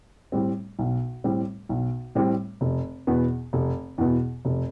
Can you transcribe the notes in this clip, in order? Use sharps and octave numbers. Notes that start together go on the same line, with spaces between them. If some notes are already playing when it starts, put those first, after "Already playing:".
A2 G3 C4
B1
A2 G3 C4
B1
A2 G3 C4
F1
E2 B2 B3
F1
E2 B2 B3
F1